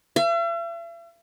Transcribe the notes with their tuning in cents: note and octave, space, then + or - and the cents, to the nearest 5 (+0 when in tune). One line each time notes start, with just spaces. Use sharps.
E5 +45